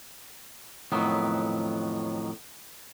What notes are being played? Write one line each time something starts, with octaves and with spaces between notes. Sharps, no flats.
F2 A2 D#3 F#3 B3